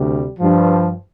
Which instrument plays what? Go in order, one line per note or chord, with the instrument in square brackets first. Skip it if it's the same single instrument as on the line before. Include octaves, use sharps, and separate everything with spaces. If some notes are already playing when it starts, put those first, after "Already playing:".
Already playing: [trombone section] D2 C3 G3
G2 F3